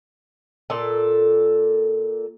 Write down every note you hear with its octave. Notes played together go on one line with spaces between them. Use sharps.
A#2 A4